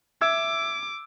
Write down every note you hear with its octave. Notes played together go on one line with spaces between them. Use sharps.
E5 D6 E6 G#6